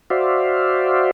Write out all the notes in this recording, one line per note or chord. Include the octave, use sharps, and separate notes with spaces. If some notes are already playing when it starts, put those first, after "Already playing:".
F#4 C5 D5 E5 F5